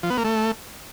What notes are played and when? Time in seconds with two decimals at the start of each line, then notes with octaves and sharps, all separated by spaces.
0.03 F3
0.10 B3
0.17 A#3
0.25 A3